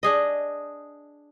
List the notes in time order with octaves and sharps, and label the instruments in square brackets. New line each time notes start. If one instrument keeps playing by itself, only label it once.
[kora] D4 G#4 D#5